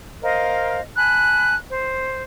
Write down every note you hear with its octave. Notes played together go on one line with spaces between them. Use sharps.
A#4 C5 D#5 F5
G#5 A5 B5 F#6
C5